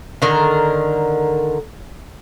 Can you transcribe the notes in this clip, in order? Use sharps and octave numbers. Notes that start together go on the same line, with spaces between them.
D3 D#3 A#4